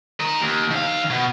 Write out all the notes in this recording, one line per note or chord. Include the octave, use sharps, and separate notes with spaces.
A#4 D#5
D#2
D#3 F5
B2